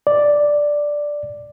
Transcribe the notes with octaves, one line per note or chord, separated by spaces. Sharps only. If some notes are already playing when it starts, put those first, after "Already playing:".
D5